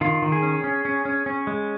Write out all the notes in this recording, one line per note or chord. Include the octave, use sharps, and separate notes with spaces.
D#3 F4
D#3
G#4
C#4
C#4
C#4
C#4
C#4
G#3